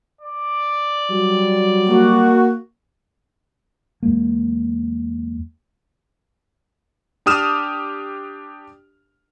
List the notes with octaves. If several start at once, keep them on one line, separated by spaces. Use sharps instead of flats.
D5
F#3 G3
A#3 F#4
E2 F#3 G#3 A#3
D4 G4 D#6 F6 E7